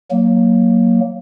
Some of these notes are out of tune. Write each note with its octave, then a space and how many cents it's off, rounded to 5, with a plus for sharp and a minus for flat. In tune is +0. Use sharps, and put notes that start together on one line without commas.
F#3 +0 A#3 +0